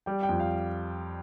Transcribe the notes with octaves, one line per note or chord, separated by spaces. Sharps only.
G3 G5
G5
F2
F5